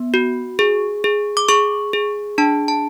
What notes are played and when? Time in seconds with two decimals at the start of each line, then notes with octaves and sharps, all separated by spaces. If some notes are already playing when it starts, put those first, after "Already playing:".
Already playing: B3
0.14 F#4
0.59 G#4
1.04 G#4
1.37 D6
1.48 G#4 C#6
1.93 G#4
2.38 D4 A5
2.68 A5